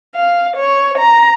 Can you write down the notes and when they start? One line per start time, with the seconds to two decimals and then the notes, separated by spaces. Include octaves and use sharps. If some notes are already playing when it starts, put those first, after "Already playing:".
0.16 F5
0.56 C#5
0.97 A#5